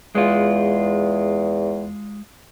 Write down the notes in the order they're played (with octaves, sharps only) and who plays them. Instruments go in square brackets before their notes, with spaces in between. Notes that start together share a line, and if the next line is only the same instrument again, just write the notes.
[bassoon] E2 [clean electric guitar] G#3 F4